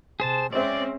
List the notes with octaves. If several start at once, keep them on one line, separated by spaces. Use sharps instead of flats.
C3 G#4 C5 A5
G#3 C4 C#4 C5 D5 E5